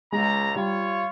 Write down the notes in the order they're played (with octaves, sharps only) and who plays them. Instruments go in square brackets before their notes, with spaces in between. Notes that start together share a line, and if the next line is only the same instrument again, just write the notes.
[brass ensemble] C#2 A#5 [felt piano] G#3
[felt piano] G3 [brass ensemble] F4 C#5